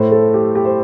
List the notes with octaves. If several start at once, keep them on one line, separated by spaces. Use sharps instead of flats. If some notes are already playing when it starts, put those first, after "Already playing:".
Already playing: A2 A3 C5
A4
G4
G4
C5